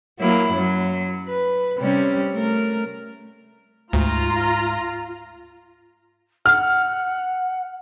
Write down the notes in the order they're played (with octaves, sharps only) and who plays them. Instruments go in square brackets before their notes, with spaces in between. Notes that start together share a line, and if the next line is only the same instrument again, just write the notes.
[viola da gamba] F#3 A#3 E4
F#2 F#3
B4
C3 G3 C#4
A3 A#4
[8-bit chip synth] D2 [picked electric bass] G#2 [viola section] F4 A#5
[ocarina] F#5 [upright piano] F6